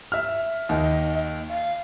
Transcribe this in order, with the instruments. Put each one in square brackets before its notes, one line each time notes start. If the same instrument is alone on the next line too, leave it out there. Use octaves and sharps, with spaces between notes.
[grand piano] E5 F6
[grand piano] D#2 [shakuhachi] D#5
[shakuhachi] F5